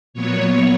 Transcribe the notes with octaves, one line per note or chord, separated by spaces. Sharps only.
A#2 F#3 B3 C#5